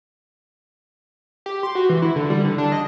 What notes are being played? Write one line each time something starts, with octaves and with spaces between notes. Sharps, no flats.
G4
C6
F#4
E3
E4
D3
G3
D3
D4
D#5